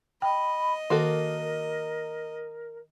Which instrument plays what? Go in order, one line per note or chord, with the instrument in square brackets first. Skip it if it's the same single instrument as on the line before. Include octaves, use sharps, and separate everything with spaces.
[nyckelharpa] D#5 [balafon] G5 [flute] B5
[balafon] D#3 [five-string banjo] A#3 F#4 A4 [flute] A#4